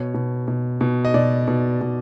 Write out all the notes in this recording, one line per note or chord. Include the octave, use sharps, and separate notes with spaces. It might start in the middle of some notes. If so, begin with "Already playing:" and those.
Already playing: B2 C#5
B2
B2
B2
D#5
B2 D5
B2
B2